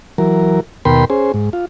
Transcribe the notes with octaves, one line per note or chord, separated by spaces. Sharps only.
E3 F#3 A#4
D#2 B2 A#4 G5 B5 C6
C#4 G#4 C5
G#2
F4